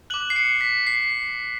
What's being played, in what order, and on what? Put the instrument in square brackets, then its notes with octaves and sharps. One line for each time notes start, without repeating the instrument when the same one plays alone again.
[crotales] D6 F#6 F#7
C7
C#7
B6
C7